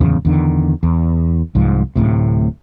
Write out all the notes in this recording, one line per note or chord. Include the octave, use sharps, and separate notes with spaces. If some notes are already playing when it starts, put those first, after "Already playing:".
D1 E2 C#3
E2 D3 D#3
E2
C2 G#2 F3
D1 G1 A2 C3